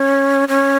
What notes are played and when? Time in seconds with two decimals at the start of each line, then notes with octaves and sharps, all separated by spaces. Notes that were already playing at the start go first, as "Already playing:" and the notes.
Already playing: C#4
0.48 C#4